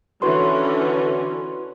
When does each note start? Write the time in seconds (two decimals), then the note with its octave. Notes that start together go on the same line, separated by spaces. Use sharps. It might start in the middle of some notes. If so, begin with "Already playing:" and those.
0.22 D3 E3 C#4 F#4 B4 C6